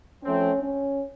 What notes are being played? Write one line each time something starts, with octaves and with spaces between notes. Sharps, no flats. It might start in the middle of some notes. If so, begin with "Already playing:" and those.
F3 A3 C4 C#4
C#4